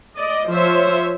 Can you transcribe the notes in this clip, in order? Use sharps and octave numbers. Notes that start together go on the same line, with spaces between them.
D5 D#5
F3 C5 C#5 E5